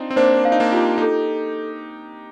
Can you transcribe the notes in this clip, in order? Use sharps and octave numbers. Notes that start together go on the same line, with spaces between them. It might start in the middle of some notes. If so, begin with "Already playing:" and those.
Already playing: C4 D4 D#4 F4
C4
A#3 D4 C5
D4 F5
D#4
A#3 D4
F4 G4
D#4 G4 A4